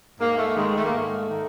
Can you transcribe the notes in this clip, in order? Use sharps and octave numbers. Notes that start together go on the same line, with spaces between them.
G#2 A#3
A3
D#3 G#3
A3
A#3
G#2 A3
D#3